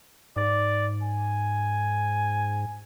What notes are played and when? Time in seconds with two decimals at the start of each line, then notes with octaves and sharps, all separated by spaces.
0.36 G#2 D5
1.02 G#5